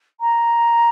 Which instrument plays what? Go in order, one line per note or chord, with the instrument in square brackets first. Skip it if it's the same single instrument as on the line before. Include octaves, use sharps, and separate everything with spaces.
[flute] A#5